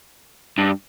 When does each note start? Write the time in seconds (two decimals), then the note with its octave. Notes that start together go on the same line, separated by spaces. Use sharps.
0.58 G2